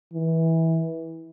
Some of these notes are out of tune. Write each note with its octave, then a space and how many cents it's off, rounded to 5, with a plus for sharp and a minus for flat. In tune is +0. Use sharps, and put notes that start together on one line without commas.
E3 -20